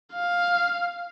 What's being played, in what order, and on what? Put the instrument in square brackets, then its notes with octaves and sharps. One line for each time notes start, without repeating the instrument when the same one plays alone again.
[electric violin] F5